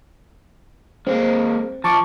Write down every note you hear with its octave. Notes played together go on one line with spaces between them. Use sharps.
G#3 A#3 C4
F3 A5 C#6 D6